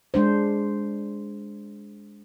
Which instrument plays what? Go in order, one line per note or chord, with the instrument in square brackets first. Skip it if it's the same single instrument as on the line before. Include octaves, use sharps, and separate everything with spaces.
[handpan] G#3 D4 C5